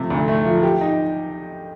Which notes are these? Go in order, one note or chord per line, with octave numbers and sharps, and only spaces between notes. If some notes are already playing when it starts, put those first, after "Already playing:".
Already playing: C3 F3 A3
D2
A3
F3
G4
D#4